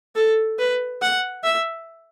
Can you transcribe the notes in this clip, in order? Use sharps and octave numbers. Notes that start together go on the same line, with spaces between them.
A4
B4
F#5
E5